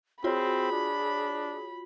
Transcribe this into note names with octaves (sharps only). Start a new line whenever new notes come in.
C4 F4 F#4 G#4 C#5 B5
D4